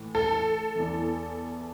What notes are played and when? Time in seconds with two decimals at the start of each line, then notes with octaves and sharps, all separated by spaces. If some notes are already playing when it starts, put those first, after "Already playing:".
Already playing: A2 E3
0.15 A4
0.76 E2 E3